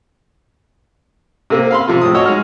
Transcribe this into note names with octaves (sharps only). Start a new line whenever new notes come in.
C3 A#3 C4
F5 B5 C6
C3 F3 F4
A2 F3 D#6
F#4 C#5 D#5 E6
G#3 D#4 F6